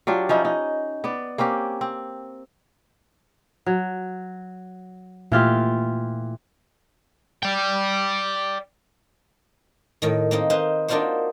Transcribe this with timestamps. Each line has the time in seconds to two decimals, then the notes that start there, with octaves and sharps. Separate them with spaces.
0.07 F#3 D4 F4 G4
0.29 F3 C#4 D#4 E4
0.45 D#4
1.04 B3 D5
1.38 A#3 C4 C#4 G4
1.81 C4
3.66 F#3
5.32 A#2 E3 A3 F4 G4
7.43 D5 G5
10.02 A2 D#3
10.31 A#3 C4 D#4
10.50 D#4 B4 C5 F5
10.88 A#3 D4 D#4 F4 F#4 C5